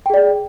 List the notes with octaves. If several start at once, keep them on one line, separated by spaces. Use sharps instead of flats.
G#4 D5 G5